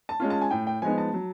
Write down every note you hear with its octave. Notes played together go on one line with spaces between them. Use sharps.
A5
G#3 C#4 F4
A5
G#5
A2 G5
G5
F3 G#3 B3 D#4 G#5
A5
F#3